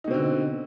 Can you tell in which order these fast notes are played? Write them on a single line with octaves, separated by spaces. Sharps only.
D#4 B2 C4 D3